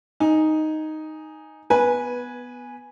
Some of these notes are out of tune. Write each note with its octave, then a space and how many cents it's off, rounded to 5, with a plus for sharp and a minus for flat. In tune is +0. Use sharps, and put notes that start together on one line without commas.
D#4 +0 G#5 +0
B3 +0 B4 -15 G#5 +0